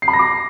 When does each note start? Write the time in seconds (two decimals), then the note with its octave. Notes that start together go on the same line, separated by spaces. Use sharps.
0.02 C7
0.08 B5
0.13 A#6
0.19 D6